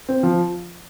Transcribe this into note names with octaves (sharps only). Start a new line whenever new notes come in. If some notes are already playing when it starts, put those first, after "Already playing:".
C4
F3